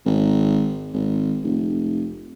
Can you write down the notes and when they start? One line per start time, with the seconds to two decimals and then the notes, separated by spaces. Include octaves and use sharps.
0.06 G#1
0.93 G#1
1.44 F1